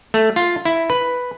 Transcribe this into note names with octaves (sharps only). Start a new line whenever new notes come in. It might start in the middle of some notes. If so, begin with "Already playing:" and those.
A3
F4
E4
B4